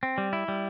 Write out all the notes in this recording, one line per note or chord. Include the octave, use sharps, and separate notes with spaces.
C4
G3
E4
G3